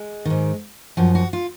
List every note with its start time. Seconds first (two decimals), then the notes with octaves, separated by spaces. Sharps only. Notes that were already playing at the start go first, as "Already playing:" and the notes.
Already playing: G#3
0.25 G#2 D#3
0.97 F#2 F3 F#4
1.15 F#4
1.33 F4